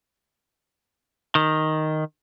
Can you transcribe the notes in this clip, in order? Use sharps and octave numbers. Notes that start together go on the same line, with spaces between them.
D#3